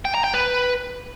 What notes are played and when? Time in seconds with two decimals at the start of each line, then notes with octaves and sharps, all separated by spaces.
0.05 G5
0.15 A#5
0.24 G5
0.34 B4